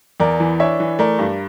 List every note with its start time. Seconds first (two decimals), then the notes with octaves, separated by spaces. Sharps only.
0.20 E2 A#4 D5
0.40 E3
0.60 D4 C#5 E5
0.80 E3
0.99 A3 A#4 D5
1.19 G2